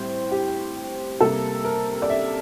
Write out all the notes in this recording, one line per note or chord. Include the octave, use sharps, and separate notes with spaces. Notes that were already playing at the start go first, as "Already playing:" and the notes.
Already playing: A2 G3 C4 C5
G4
C3 G3 A#3 A4
A#4
D5
E5